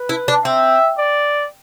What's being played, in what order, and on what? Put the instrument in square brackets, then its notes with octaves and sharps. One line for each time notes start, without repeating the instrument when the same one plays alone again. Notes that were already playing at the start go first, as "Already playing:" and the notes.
Already playing: [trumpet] B4
[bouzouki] E4
D4
[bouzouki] C4 [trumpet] E5
[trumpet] D5